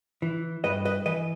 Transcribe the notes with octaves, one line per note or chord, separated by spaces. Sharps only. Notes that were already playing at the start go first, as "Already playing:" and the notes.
E3
G2 B4 D#5
B4 D#5
E3 B4 D#5